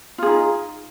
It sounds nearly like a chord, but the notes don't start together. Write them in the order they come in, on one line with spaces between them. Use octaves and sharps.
F4 G#4 D#4